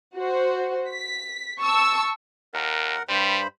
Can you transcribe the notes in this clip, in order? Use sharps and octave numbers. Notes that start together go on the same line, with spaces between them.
F#4 C5
B6
A5 C#6 E6
D#2 A#4 F#5
G2 G3 C5 B5